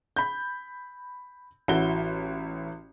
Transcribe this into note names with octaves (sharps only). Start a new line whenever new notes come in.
B5 G6
A1 E4 F#4 G7